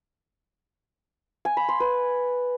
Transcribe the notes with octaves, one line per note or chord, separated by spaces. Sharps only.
G#5
B5
C6
B4